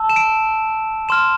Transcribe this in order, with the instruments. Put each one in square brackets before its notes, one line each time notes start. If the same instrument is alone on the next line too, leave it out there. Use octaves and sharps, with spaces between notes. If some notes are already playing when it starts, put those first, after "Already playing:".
Already playing: [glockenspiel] A5 E6
E7
D7
C6 F6 E7